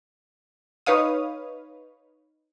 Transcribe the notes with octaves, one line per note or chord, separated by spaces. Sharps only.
D#4 B4 C#5 F5 D#6